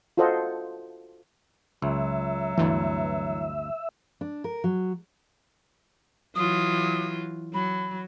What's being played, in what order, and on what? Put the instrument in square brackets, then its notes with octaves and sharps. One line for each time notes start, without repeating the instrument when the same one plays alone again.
[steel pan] F4 F#4 A4 C5 D#5 F#5
[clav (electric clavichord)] C#2 [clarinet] F#3 [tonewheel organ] E5
[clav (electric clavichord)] G1 D2 [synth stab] E3
[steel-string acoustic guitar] D4
A#4
F#3
[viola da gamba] E3 F#3 F4 [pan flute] D#6
[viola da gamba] F#3 [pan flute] B5